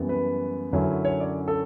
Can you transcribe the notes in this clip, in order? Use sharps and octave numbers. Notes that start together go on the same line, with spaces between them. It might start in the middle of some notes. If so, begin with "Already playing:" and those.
Already playing: F#2 E3 G3 B3
B4
F#2 D3 F#3 C#4 E4
C#5
D5
A4